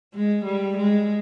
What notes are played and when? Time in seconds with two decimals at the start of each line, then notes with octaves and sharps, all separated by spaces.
0.14 G#3
0.45 G3
0.77 G#3